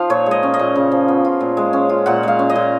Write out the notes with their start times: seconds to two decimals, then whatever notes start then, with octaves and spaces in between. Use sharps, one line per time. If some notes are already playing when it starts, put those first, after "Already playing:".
Already playing: F3 D#4 F4 F5
0.10 A#2 C#5
0.26 G#3 D#5
0.43 C#4
0.54 D#5
0.59 A#2
0.76 C#3
0.91 F3
1.08 B3
1.25 F4
1.41 A#2
1.57 G#3
1.73 C#4
1.89 F4
2.06 A#2 F#5
2.23 G#3 F5
2.39 C#4
2.50 D#5
2.56 A#2